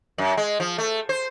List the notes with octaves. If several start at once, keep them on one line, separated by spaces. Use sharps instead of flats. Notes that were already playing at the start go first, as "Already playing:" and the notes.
F#2
G#3
F3
A3
C5